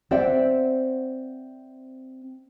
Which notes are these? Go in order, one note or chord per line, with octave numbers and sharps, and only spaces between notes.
C4 C5 D5 E5 F#5 G5